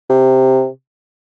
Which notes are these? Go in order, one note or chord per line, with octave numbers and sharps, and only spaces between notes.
C3